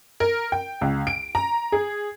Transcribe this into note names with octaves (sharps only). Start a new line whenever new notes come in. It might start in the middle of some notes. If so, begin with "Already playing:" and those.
A#4
G5
C#2
D7
A#5
G#4